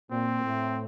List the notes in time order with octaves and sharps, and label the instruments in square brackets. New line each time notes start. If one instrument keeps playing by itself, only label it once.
[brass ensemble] A#2 A#3 [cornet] C4
[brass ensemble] A2 A3